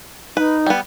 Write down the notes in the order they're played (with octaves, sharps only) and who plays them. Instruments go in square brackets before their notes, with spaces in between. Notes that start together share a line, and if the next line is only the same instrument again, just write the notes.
[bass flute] D#4 [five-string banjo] B4
[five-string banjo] G3 B3